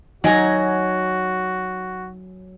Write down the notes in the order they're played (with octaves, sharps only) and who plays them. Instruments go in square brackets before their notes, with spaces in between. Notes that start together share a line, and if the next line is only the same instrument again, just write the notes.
[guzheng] F#3 G#5 A#5 [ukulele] D#4 F#5 [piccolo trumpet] F#4